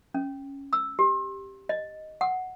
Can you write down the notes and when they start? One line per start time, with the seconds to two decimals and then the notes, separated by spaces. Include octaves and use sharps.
0.15 C#4
0.73 E6
0.99 G4
1.69 D#5
2.21 F#5